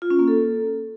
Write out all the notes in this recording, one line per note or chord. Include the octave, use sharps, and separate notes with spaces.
F4
C#4
A#3
A4